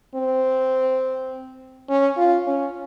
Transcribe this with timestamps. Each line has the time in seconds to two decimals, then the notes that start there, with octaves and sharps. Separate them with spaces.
0.15 C4
1.89 C#4
2.17 F4
2.47 C#4